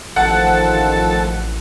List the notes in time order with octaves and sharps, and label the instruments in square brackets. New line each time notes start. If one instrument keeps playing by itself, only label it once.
[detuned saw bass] A1 [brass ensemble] D#3 F3 [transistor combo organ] A4 [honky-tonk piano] F#5